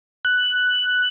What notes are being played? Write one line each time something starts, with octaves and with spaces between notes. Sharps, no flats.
F#6